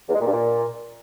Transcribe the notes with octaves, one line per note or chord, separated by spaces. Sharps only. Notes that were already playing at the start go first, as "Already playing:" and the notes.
E2
G#3
A#2
G2
A#2